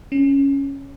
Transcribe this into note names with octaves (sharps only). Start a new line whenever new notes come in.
C#4